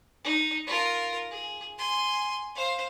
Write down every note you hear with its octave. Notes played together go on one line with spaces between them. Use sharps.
D#4
F4 A#4
G#4
G#5 C6
C5 F5